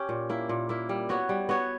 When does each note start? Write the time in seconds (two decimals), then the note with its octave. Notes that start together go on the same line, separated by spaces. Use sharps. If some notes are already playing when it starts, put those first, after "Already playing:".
Already playing: C#4 G4
0.09 A#2
0.29 A#3 E4
0.49 A#2
0.69 A#3 E4
0.89 G3
1.09 B3 F#4 C#5
1.29 G3
1.49 B3 F#4 C#5